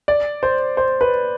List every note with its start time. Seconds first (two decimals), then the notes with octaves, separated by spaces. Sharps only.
0.08 D5
0.43 C5
0.77 C5
1.01 B4